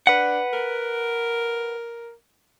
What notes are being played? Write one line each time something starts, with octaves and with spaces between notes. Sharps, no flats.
D4 B4 F#5
A#4